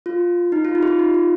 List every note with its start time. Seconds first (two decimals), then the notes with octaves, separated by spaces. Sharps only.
0.06 F4
0.52 D#4
0.65 F4
0.75 D#4
0.83 G4
0.87 F4
0.99 D#4
1.14 F4